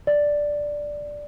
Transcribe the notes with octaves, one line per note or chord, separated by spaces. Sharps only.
D5